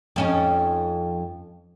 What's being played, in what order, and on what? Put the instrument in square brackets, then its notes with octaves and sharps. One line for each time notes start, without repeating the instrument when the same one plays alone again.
[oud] F2 C#4 D#4